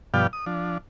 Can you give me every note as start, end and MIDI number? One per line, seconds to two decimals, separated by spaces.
0.14 0.27 43
0.14 0.27 47
0.14 0.27 53
0.14 0.27 74
0.14 0.27 77
0.14 0.27 79
0.33 0.45 87
0.46 0.78 53
0.46 0.78 62